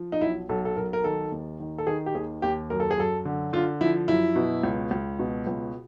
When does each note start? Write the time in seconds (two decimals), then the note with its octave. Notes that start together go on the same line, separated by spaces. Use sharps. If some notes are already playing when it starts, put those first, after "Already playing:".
Already playing: F3
0.12 D#4
0.21 B1 E4
0.49 B1 A4
0.65 A4
0.77 B1 A#4
0.93 A#4
1.04 D#3 A4
1.32 D#2
1.60 D#3
1.78 A4
1.87 D#3 G#4
2.06 G4
2.15 D#2 G#4
2.42 D#2 G4
2.70 F#2 A#4
2.80 A4
2.91 G#4
2.98 F#2 A4
3.25 D3
3.53 D3 F4
3.81 F3 E4
4.08 F#2 E4
4.36 B2
4.63 C#2
4.91 C#2
5.19 B2
5.47 C#2